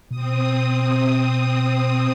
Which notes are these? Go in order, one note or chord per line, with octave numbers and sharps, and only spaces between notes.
B2 C4 D#6